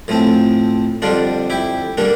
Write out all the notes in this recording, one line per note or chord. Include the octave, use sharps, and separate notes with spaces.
A2 F3 C4
F2 D3 G3 D4 F4
E4 G4
D3 G3 A#3 D4